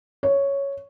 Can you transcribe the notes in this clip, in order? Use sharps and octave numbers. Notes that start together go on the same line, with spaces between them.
C#5